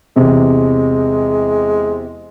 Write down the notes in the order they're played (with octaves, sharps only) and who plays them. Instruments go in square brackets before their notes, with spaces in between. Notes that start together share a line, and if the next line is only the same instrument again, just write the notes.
[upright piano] E2 C3 [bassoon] G#3